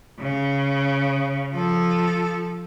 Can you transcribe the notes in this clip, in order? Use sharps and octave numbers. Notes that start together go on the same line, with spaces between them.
C#3
F3 A4